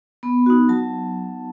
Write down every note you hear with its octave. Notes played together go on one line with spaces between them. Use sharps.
B3 B5
D#4 F#4
F#3 A5